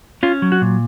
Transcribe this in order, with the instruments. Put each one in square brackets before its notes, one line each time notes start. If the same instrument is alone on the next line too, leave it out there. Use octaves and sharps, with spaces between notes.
[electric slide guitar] C#4 F4
F#3
F#4
A#2